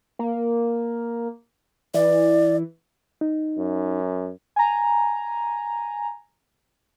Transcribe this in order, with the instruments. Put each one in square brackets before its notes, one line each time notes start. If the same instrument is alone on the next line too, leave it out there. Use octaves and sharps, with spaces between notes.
[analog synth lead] A#3
[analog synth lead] E3 [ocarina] D5
[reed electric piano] D#4
[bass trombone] F#2
[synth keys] G#5 A#5